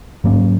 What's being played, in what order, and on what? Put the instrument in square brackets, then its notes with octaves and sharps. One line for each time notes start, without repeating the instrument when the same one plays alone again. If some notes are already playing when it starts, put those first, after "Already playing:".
[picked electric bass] G#2 F#3 A#3 C#4